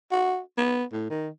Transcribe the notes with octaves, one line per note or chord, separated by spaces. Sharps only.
F#4
B3
A2
D#3